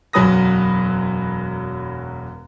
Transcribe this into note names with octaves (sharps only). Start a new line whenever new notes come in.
E1 F#2 F#3 B4 D#6 A#6